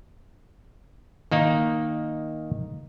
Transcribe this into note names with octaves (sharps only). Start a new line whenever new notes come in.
D#3 A#3 D#4